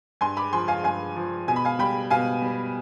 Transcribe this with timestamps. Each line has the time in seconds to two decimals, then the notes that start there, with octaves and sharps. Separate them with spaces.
0.21 G2 G#5 C6
0.37 B5 D6
0.53 F3 G#5 C6
0.68 F5 G#5
0.84 G2 F5 G#5
1.16 F3
1.48 B2 G#5
1.56 B5
1.65 F5 G#5
1.79 G3 G5 B5
2.11 B2 F5 G#5
2.42 G3